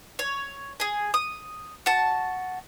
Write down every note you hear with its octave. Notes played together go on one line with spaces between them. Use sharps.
C#5
G#4 G#5
D#6
F#4 A5